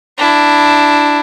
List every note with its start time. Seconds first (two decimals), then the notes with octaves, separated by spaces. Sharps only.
0.18 D4 E4